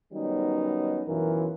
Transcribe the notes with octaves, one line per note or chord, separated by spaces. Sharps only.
D#3 F#3 G3 B3 C#4 D#4
B1 F#2 E3 F4 A#4